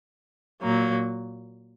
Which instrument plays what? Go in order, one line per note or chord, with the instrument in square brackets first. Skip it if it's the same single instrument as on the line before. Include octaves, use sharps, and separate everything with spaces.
[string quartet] A#2 F#3 A#3